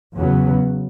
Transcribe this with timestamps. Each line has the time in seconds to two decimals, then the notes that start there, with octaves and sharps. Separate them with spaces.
0.16 E2 C#3 F#3 B3